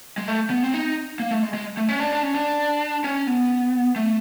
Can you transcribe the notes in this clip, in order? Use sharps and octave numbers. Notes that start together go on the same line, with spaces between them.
G#3
A3
B3
C4
D#4
A#3
A3
G#3
G#3
A3
C#4
D4
D4
C#4
D4
C#4
B3
A3